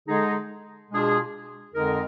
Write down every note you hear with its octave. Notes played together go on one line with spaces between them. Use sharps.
D3 G#3 D#4 G#4
B2 G#3 D4 F4 G#4
F2 D3 G#3 D#4 A#4